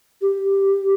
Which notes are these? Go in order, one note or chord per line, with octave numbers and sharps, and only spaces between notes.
G4